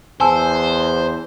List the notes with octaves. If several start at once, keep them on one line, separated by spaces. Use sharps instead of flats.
E2 C5 G#5 A5 E6